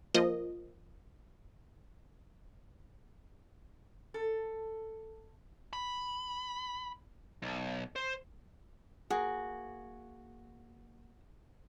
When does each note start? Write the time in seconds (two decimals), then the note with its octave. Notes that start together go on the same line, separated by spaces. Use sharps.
0.14 F3 A#3 D#5
4.14 A4
5.73 B5
7.42 B1
7.96 C5
9.10 A#3 F#4 G#4